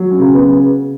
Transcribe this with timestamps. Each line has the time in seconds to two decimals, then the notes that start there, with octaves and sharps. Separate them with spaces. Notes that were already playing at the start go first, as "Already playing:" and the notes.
Already playing: F#3
0.11 C#4
0.19 C#3
0.34 B3